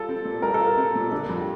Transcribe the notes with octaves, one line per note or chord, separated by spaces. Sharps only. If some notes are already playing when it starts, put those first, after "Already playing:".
Already playing: G3 F4 A4
C4
A#2
G3 A#4
A4
F4
A#4
C4
A#2
D3 A4
F2
G4